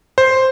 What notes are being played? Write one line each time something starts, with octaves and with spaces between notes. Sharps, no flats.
C5